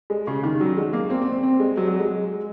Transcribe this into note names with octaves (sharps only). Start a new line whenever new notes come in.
G#3
C#3
D#3
F#3
G#3
A#3
C4
C4
C4
C4
G#3
F#3
F#3
G#3